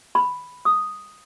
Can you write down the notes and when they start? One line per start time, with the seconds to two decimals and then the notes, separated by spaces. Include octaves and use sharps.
0.15 B5
0.65 D#6